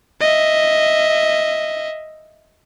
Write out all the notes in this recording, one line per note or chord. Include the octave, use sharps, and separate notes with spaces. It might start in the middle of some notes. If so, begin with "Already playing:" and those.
D#5 E5